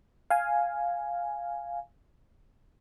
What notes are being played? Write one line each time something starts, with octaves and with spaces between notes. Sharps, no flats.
F5 G#5